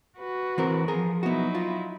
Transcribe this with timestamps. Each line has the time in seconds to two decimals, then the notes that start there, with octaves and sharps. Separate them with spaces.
0.18 F#4 B4
0.58 E3 C4 A#4
0.88 F3 G#4 A#4
1.23 F#3 B3 D#4 E4 F#4
1.55 F4